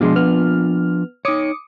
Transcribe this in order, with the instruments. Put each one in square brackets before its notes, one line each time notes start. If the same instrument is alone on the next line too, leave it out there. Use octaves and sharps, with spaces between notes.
[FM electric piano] B2 G#3 C6 [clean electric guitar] F3 D4 F4
[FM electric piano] B3 F6
[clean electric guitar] D#4 C#5 [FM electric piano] D6 D#6 C#7